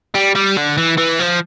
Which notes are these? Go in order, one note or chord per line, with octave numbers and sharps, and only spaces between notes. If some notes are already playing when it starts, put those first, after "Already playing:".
G3
G3
D3
E3
E3
F3